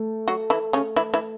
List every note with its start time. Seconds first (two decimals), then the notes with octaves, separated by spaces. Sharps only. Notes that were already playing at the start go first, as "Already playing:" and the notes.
Already playing: A3
0.28 F#3 F#4
0.50 E3 E4
0.73 C#3 C#4
0.96 E3 E4
1.14 E3 E4